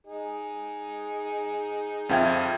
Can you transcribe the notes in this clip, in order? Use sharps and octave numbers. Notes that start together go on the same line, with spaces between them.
D#4 G#4
F2 F3 E5 F5 G5 G#6